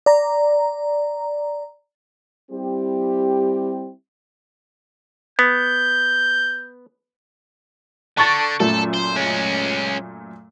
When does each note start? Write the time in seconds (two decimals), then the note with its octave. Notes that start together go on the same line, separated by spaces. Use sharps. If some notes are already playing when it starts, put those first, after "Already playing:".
0.06 D5 A#5
2.51 G3 C4 E4 G4
5.39 B3 G6
8.17 D3 A5 C#6 A6
8.60 F#2 A#2 A3 A4
8.94 C5
9.16 G#3 C#4